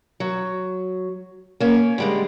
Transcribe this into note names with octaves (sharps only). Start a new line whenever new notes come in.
F#3
A#3 C#4
D3 G3 G#3